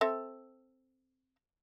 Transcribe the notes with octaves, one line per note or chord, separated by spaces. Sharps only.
C4 A4 E5